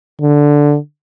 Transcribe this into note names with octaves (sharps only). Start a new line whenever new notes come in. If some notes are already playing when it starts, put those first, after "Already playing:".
D3